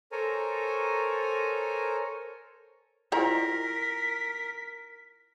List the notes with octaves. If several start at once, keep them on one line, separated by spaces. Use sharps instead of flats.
A4 A#4 C5 C#5 G#5 A#5
E4 F4 A#4 C5 D#5 A#5 B6